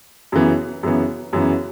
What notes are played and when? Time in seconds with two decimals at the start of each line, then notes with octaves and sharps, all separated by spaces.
0.32 F#2 C#3 E3 B3
0.83 F#2 C#3 E3 B3
1.33 F#2 C#3 E3 B3